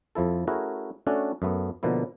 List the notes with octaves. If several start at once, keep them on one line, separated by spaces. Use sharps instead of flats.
F2 F3 E4 A4
A3 C#4 E4 F#4 G#4 A#4
A3 C#4 D4 F#4 A4 C#5
F#2 A3 B3
B2 D3 F3 A#3 E4